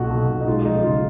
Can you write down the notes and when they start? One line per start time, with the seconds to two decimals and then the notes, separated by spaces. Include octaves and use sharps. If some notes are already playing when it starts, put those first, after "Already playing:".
Already playing: B1 A#2 F#4
0.10 B1
0.29 B1
0.41 D#4
0.47 G#3 F4
0.65 F3 D#4
0.76 D#4
0.84 F#1 F4